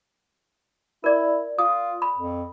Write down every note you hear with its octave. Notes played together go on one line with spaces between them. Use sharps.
E4 A#4 D5
F4 D#6
B5
F2